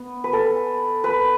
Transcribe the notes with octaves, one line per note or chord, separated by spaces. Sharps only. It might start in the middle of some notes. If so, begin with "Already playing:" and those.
Already playing: B3
B4
A4
B4